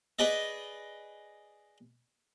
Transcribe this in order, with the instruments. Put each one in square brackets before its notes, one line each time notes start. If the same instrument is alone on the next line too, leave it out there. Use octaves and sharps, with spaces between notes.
[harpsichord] G#4 B4 D5 D#5